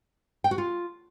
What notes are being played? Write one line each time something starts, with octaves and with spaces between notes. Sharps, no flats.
G5
F#4
F4